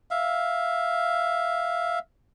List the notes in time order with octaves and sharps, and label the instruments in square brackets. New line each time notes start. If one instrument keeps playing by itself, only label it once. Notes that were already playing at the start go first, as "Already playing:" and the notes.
[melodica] E5 F5